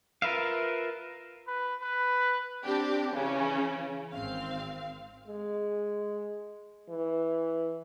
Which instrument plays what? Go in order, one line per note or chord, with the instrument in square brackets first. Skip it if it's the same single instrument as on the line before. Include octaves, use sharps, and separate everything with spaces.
[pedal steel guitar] F4 A#4 B4 E5 F5
[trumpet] B4
B4
[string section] C4 D4 G4
C#3 E3 C#4
G#1 C4 F5
[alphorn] G#3
E3